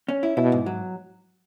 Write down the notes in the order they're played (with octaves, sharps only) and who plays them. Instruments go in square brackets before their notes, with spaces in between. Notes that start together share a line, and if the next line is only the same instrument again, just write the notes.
[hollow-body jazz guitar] C#4
E4
[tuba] B2 [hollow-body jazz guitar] E4
[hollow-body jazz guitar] G#2
F#3